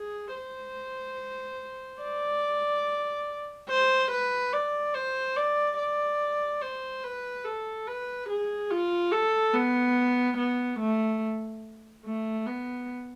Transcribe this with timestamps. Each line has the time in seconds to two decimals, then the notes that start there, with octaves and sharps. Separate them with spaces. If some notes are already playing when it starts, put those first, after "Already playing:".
Already playing: G#4
0.34 C5
2.02 D5
3.69 C5
4.11 B4
4.52 D5
4.94 C5
5.36 D5
5.78 D5
6.61 C5
7.03 B4
7.44 A4
7.86 B4
8.29 G#4
8.70 F4
9.12 A4
9.54 B3
10.37 B3
10.79 A3
12.04 A3
12.46 B3